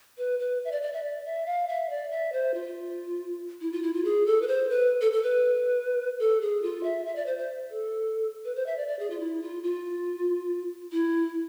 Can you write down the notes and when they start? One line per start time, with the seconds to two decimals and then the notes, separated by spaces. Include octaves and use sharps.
0.18 B4
0.39 B4
0.65 E5
0.72 D5
0.83 D5
0.93 E5
1.04 D5
1.25 E5
1.46 F5
1.68 E5
1.90 D5
2.11 E5
2.33 C5
2.54 F4
3.61 E4
3.72 F4
3.83 E4
3.94 F4
4.04 G#4
4.26 A4
4.42 B4
4.47 C5
4.70 B4
5.01 A4
5.12 A4
5.23 B4
6.19 A4
6.41 G#4
6.62 F4
6.84 E5
7.05 E5
7.16 D5
7.26 C5
7.38 C5
7.70 A4
8.45 B4
8.56 C5
8.66 E5
8.77 D5
8.88 D5
8.99 G#4
9.10 F4
9.20 E4
9.42 F4
9.63 F4
10.92 E4